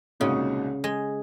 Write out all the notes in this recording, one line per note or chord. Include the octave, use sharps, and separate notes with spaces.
C2 A#2 C#3 G#3 D#4 F#4
G#3